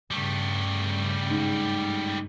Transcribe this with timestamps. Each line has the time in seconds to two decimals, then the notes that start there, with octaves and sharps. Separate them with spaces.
0.11 G2 C#3 G3 A3
1.30 G#2